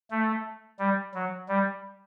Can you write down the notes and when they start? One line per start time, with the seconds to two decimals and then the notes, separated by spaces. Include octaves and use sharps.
0.11 A3
0.79 G3
1.14 F#3
1.49 G3